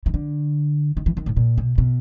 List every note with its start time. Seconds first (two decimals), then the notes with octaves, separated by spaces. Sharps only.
0.06 D#3
0.14 D3
0.97 D#3
1.06 E3
1.17 D#3
1.26 A2
1.37 A#2
1.58 B2
1.78 B2